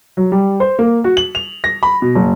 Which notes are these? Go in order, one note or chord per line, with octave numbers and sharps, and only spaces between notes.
F#3
G3
C5
A#3
F#4
F#7
F7
A#6
B5
B2
F#1